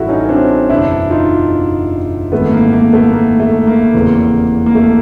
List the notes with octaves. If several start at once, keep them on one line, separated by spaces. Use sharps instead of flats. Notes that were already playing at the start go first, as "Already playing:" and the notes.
Already playing: A1 G2 E3 E4 F#4 A4
C#4 D#4
C#4
C4 D4
F#1 E2 B2 D4 E4
D#4 F4
G#1 G#2 E3 A3 B3
A#3
A#3
A3 B3
A#3
A3
A#3
F1 E2 C#3 E3
A#3
A3